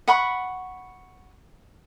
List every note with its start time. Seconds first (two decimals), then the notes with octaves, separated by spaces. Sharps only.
0.08 F#5 B5 C#6